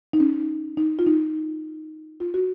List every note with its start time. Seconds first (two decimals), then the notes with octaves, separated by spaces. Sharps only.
0.13 D#4
0.20 C#4
0.77 D#4
0.99 F4
1.06 D#4
2.20 F4
2.34 F#4